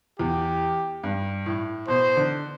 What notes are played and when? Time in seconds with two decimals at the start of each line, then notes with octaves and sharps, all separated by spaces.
0.19 E2 G4
1.04 G2
1.46 A2
1.88 B2 C5
2.17 D3